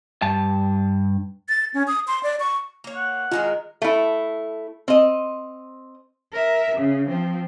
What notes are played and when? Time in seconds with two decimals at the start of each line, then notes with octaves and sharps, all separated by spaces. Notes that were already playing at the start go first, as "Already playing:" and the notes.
0.22 G2 A5
1.49 A6
1.74 C#4
1.88 D#6
2.08 C6
2.23 D5
2.40 C#6
2.84 A#3 C#5
2.96 F#5
3.32 D#3 G#3 F4 A#4
3.82 A3 E4
4.88 C4 D#5
6.31 A#4 E5
6.74 C#3
7.07 F3 C4